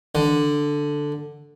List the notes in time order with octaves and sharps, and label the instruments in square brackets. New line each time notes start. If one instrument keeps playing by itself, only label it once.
[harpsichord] D3